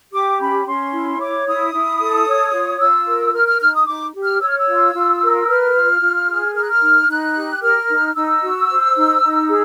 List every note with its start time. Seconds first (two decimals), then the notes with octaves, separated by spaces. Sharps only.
0.13 G4 D6
0.39 C#4 B5
0.67 C#4 C6
0.93 E4
1.20 C#5 D6
1.47 E4 D#6
1.73 E4
2.00 A4
2.27 C#5
2.54 F4
2.80 F4 E6
3.07 A#4
3.33 A#4 F6
3.47 F6
3.61 D#4 F6
3.74 D#6
3.87 D#4 D6
4.14 G4
4.23 F6
4.41 C#5 E6
4.49 F6
4.58 E6
4.68 F4
4.94 F4
5.22 A#4
5.47 B4 F6
5.75 F4
6.02 F4
6.29 G#4
6.54 A#4 F6
6.63 F#6
6.70 F6
6.81 D#4
7.08 D#4 F#6
7.35 G4
7.62 A#4 F6
7.89 D#4
8.15 D#4 E6
8.42 F#4
8.69 C5
8.96 D#4
9.22 D#4
9.49 G#4